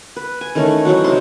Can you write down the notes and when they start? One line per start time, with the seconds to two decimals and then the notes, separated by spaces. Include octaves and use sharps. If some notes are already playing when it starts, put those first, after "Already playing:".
0.16 B4
0.41 G#5
0.55 D#3 E3 A3 C#4
0.85 E3 F#3 D#4 F#4
1.04 C3 D#4 C6